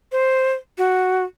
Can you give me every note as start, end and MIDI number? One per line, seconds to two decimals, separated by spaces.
0.12 0.53 72
0.78 1.24 66